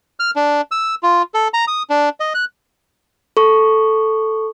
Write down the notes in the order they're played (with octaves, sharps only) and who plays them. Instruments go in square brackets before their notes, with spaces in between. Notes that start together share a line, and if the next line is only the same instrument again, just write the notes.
[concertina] F6
D4
E6
F4
A4
A#5
D#6
D4
D#5
F#6
[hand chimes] A4 C#6